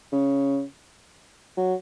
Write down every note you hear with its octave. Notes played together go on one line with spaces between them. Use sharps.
C#3
F#3